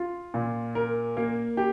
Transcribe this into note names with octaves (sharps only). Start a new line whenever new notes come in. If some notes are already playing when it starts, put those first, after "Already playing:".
Already playing: F4
A#2
A#4
A#3
G4